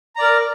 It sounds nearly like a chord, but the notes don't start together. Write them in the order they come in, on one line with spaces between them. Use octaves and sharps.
A#5 D5 A#4